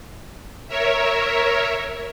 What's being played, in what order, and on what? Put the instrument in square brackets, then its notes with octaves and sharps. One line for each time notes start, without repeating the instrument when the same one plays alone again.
[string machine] A#4 C#5 E5